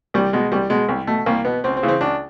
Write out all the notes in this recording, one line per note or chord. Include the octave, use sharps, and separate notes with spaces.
C2 G3
B2 G#3
C2 G3
B2 G#3
C2
B2 A3
C2 A#3
B2 B3
C#2 C4
C4
C#3 E3
C4
C#2 D4